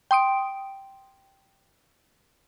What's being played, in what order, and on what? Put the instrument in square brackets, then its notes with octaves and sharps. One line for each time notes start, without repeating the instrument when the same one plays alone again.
[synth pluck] G5 C6 D#6 D7